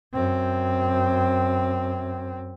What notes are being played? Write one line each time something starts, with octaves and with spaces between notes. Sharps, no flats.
F#2 C4